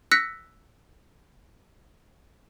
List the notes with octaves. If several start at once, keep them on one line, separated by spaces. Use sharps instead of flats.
E6 F#6 A#6 B6 C#7